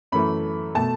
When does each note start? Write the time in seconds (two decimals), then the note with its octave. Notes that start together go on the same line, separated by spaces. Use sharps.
0.12 F#2 E3 A3 B5
0.75 B2 A3 A5